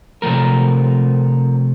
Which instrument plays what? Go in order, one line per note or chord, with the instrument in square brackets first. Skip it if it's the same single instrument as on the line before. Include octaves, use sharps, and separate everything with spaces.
[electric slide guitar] C3 F3 A3 A#4